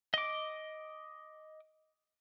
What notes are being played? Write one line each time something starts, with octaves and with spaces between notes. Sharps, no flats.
D#5 D6